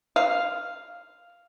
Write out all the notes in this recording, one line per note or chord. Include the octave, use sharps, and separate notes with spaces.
F5